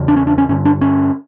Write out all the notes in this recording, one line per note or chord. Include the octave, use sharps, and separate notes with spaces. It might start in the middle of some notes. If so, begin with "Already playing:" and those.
Already playing: E2 C#3
D4
C#4
D4
C#4
G2 D3 C#4
D4
C#4